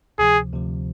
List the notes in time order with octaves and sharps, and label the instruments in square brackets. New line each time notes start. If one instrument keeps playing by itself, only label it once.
[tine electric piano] D2 C3 F3 [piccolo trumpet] G#4
[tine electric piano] D2 C3 F3